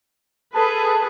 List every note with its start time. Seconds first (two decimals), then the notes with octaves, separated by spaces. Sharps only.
0.54 G#4 A4 B4 A5